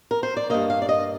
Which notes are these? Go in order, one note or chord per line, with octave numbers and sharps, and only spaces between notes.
A#4
C5
D5
G2 D#3 A#3 D#5
F5
D5
D#5